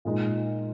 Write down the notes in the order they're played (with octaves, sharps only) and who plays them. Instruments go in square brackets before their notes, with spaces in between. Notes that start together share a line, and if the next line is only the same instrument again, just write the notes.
[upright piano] A#2 G#3 D#4